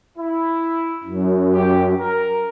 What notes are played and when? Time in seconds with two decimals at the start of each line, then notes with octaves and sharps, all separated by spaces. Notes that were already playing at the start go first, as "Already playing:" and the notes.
0.18 E4
1.03 F#2
1.54 G4
2.01 A#4